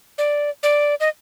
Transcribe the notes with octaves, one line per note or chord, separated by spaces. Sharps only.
D5
D5
D#5